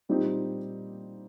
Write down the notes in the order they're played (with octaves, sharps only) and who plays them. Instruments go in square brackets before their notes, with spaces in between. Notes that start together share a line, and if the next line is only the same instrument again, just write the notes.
[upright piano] A#2 G3 C4 D#4 G4